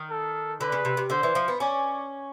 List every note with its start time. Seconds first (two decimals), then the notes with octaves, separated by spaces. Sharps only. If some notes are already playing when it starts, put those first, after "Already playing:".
Already playing: D#3
0.10 A4
0.61 D3 B4
0.72 C#3
0.85 C3
0.97 C3
1.10 D3 C5
1.23 E3
1.35 F3
1.48 B3
1.60 C#4 D5